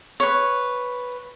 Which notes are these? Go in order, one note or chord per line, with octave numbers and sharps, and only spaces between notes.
B4 C#5